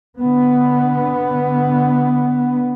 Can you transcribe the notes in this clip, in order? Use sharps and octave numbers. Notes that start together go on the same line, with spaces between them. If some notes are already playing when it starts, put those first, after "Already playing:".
D3 B3